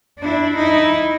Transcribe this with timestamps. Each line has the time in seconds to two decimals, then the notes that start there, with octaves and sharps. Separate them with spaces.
0.20 D4 E4
0.55 D#4 E4